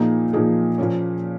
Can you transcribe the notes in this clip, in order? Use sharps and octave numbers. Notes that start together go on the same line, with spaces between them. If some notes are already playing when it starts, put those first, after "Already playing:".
Already playing: A#2 F3 A#3 D#4 G#4
A#2 F3 A#3 D#4 G#4
A#2 F3 A#3 C#4